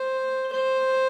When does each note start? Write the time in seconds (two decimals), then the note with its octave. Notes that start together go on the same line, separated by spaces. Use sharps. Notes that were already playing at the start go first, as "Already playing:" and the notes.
Already playing: C5
0.53 C5